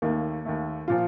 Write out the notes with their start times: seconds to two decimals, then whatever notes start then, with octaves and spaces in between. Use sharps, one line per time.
0.02 D#2 D#3 A3 A#3
0.45 D#2 D#3 A3
0.88 A#2 F3 F4